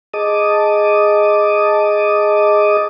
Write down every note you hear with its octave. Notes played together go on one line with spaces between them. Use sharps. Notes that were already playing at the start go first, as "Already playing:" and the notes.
G#4 D#5 A5 D6 D#6